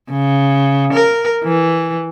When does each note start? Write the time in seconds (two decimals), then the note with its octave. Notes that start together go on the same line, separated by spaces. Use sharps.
0.11 C#3
0.93 A#4
1.43 E3